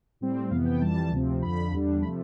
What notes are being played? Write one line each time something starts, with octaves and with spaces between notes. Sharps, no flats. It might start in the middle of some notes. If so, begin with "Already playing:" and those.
A2 G3 C4
F2 C3 E3 B3 F5
G5
F2 E3 G3 A5
D2 C3 F3 C4
F2 D3 F3 B5
E2 D3 G3 D4
C3 F3 A3 B5